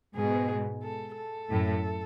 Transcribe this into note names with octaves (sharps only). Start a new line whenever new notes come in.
G#2 B2 G#4
A4
A4
F#2 A2